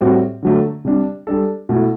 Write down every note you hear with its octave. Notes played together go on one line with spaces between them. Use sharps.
A2 G3 C4 F#4
D3 F#3 A3
C3 G3 D4
G3 D4 A4
B2 A3 E4